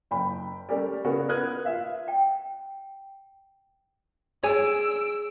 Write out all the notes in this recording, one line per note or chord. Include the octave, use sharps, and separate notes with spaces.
F#1 G5 B5
G3 A3 C#4 G4 A#4 D5
C#3 B3 F#4 A#4
A#4 B4 D#6 F#6 G#6
F4 E5 F5
G5
G#4 C#5 D5 G#5 E6 D7